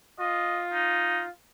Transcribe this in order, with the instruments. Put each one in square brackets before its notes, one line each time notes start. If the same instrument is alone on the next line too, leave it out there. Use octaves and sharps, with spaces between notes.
[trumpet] F4 [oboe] D#5
[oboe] D#4